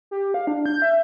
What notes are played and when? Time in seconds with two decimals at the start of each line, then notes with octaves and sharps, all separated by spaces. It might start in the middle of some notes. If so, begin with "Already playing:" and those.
0.11 G4
0.34 F5
0.47 D4
0.66 G6
0.82 E5